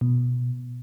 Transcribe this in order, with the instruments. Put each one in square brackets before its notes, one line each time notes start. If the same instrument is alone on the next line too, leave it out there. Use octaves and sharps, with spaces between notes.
[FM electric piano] B2